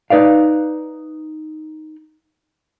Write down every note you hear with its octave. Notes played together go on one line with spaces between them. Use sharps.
D#4 B4 D5 F5